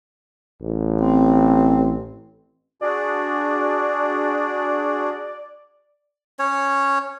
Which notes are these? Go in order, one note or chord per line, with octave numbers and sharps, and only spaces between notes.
A1
C4
D4 F#4 G#4 D5
C#4 C#5